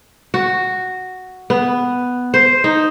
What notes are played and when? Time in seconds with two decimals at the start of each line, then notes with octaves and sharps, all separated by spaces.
0.34 F#4
1.50 B3
2.34 C5
2.64 D#4